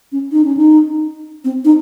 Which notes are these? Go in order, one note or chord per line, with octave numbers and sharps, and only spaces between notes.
C#4
D#4
C#4
D#4
C4
D#4